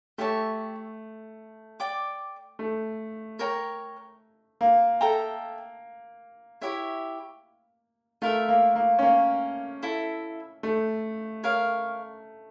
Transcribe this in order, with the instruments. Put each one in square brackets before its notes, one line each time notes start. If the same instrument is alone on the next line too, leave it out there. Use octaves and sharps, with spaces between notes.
[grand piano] A3 [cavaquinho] G4 C#5 E5 A5
[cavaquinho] D5 G5 D6
[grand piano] A3
[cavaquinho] A#4 C#5 G5 A#5
[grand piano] A#3
[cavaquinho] A4 E5 G5 A#5
E4 G4 C#5 E5
[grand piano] A3 [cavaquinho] F4 A#4 E5
[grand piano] A#3
A#3
C#4
A#3
[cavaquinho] E4 A4 E5
[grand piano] A3
[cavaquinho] A#4 C#5 F5